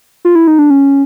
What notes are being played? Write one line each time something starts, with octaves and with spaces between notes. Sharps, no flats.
F4
E4
D#4
D4
C#4